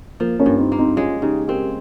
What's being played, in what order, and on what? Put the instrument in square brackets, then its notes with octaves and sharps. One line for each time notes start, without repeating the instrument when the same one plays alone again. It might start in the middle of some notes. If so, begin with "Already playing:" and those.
[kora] F3 [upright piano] A#3
[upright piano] A#3 C#4
[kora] G2
[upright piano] C4 D#4
[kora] A#3
[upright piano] C4 D#4
[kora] G#3 [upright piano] C#4 F4
[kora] C#3 [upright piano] D#4 G4
[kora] C4 [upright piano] G4 A#4